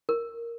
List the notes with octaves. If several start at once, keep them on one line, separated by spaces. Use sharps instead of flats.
A#4